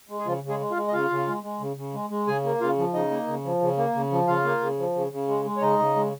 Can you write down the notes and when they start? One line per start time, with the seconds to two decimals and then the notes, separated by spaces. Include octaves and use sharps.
0.09 G#3
0.19 G#4
0.26 C#3 F3 F4
0.43 C#3
0.49 G#3 G#4
0.60 G#3
0.71 F4 F5
0.76 G#3
0.88 D#5
0.93 C#3 F4 F5
1.10 C#3
1.27 G#3
1.43 G#3
1.60 C#3
1.77 C#3
1.93 G#3
2.10 G#3
2.27 C#3 G#4 G#5
2.44 A#3
2.60 C#3 F4 F5
2.78 F3
2.94 C#3 D#4 D#5
3.11 A#3
3.27 C#3
3.45 F3
3.61 C#3
3.77 A#3
3.95 C#3
4.11 F3
4.28 C#3 F4 F5
4.45 A#3
4.61 C#3
4.79 F3
4.95 C#3
5.12 C#3
5.28 G#3
5.45 G#3
5.57 C#5
5.61 C#3 D#4 D#5
5.79 C#3
5.96 G#3